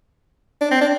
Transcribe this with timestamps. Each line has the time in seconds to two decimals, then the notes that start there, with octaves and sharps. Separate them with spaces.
0.61 D4
0.71 C4
0.81 D4